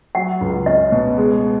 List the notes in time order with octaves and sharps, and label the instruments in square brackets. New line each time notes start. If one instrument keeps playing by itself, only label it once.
[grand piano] F#3 [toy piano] F#5
[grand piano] C#2
[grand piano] C#4 [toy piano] D#5
[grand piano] B2
G#3